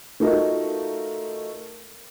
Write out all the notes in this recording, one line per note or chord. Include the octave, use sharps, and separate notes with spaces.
A3 D#4 F4 F#4 A#4 D#5